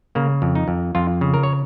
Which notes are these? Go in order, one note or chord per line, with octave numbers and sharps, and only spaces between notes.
C#3 A#3
F2
D#4
F2
F2 F4
C#3
A#4
C#5